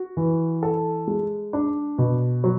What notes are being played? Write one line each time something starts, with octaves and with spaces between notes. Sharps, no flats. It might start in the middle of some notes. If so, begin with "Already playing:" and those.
Already playing: F#4
E3
A4
G#3
D4
B2
F#3